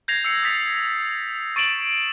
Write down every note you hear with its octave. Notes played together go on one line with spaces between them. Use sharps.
G6 G#6 A#6 C7 F7
E6 C7 C#7
D#6 A6 B6 F7
C#6 A6 D7 E7 F#7